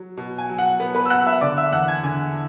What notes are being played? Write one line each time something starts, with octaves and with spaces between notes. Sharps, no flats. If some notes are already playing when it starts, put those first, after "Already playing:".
Already playing: F#3
B2
G#5
F#3
F#5
B3
B4 B5
E6
F#3 F#5 F#6
E5 E6
D3 D5 D6
E5 E6
E2 F#5 F#6
G#5 G#6
D3 G#5 G#6